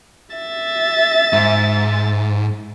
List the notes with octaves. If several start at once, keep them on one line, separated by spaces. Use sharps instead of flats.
E5 A6
G#2